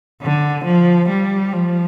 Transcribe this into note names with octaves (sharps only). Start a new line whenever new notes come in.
D3
F3
G3
F3